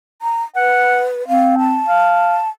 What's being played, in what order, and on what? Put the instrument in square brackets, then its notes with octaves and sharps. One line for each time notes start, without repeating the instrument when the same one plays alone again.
[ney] A#5
[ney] B4 [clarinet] F#5
[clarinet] C4 [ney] F5
[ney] A5
[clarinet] F5